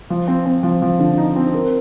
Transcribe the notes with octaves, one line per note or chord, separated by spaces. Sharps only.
F3
C4
C4
F3
F3
D3
D#4
C4
A#4